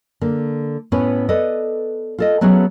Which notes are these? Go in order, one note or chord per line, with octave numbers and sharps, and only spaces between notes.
D3 A#3
A2 B3 C#4 B4 C#5 G#5
A4 B4 D5 D#5
F4 A4 D#5
F#3 A3 B3 C#4 F#4 G#4